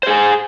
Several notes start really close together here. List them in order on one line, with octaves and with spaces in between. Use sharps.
C5 G#4 G#5